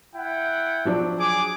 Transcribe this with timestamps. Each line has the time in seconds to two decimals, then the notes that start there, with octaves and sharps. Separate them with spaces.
0.16 E4 F#5 G5
0.85 F3 F#3 D4
1.19 G#4 D6